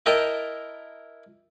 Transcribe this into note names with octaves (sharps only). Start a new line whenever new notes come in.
E4 A#4 D#5 G5 A5 A#5